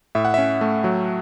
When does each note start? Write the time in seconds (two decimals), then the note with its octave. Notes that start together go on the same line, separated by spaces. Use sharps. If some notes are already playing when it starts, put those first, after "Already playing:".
0.15 A2 E5
0.25 F#5
0.34 C#4 E5
0.61 A3
0.84 F#3